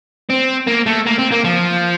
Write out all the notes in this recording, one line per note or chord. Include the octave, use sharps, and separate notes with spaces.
C4
A#3
A3
A#3
C4
A#3
F3